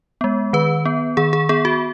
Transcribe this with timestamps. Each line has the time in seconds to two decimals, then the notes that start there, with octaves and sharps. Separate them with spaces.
0.21 G#3 B3
0.53 D#3 B4
0.85 B3
1.17 D#3 G#4
1.33 G#4
1.49 B3 G#4
1.65 F#4